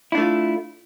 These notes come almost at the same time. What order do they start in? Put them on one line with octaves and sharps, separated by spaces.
E4 D4 A3 F4